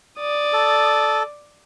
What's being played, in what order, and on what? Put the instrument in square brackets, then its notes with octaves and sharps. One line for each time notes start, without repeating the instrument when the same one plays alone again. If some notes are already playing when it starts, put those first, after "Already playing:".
[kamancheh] D5 D#6
[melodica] A4